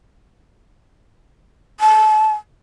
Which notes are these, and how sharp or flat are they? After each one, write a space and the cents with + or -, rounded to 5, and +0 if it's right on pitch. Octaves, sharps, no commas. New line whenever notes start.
A5 -30